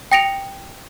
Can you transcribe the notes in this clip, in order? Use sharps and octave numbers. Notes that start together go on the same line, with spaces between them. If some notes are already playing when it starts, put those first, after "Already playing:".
G5 D#6 A#6 C#7 D7 F7